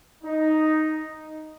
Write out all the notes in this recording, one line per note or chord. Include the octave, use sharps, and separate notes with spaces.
D#4